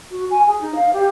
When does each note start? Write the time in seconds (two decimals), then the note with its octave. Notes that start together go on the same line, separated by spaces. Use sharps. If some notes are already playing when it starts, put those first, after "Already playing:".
0.10 F#4
0.30 G#5
0.46 G#4
0.60 D#4
0.74 F5
0.93 G4